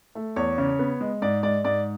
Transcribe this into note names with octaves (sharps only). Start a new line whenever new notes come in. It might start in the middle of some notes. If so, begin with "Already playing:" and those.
A3
E2 C#5
C#3
B3
G#3
G#2 D5
G#3 D5
G#2 D5